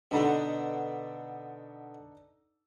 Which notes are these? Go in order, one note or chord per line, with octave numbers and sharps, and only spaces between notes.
B2 D3 B3 D4 D#4 A4